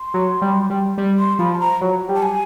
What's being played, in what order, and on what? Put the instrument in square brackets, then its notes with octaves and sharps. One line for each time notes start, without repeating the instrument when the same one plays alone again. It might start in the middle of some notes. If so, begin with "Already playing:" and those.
Already playing: [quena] C6
[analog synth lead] F#3
G3
G3
G3
[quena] C6
[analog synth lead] F3 [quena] B5
[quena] A5
A#5
[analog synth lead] F#3
G3
[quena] A5
G#5